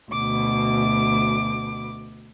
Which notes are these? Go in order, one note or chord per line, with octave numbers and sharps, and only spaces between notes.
D2 B2 D6